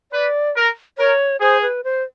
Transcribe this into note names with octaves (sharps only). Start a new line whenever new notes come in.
B4 D5
A#4
A#4 C#5
G#4 C5
B4
C5